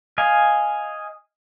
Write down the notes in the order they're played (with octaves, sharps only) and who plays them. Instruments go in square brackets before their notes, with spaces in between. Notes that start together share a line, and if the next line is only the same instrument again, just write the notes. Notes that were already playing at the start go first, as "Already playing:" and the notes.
[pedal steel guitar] D#5 F5 G#5